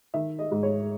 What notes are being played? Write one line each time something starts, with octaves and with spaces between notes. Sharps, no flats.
D#3 E5
D#5
G#2
C#5